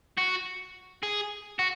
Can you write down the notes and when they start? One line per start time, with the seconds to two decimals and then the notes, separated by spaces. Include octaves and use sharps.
0.18 F#4
1.03 G#4
1.59 F#4